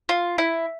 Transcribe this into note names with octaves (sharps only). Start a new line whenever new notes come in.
F4
E4